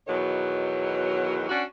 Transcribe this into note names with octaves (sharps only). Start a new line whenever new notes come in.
E2 B2 D#3 F#3 C#5
C#4 D4 F#4